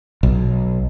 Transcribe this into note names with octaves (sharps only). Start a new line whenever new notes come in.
B1